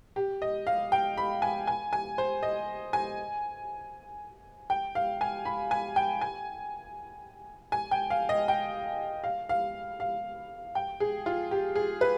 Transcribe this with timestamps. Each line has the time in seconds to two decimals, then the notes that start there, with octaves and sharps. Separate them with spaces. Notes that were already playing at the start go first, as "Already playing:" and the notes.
0.16 G4
0.42 D#5
0.67 F5
0.92 G5
1.17 B5
1.42 G#5
1.67 G#5
1.93 G#5
2.18 C5
2.43 D#5
2.93 G#5
4.70 G5
4.95 F5
5.21 G#5
5.45 B5
5.71 G#5
5.96 G5
6.21 G#5
7.72 G#5
7.91 G5
8.10 F5
8.29 D#5
8.48 G5
9.24 F5
9.49 F5
10.00 F5
10.75 G5
11.00 G#4
11.26 F4
11.51 G4
11.76 G#4
12.01 B4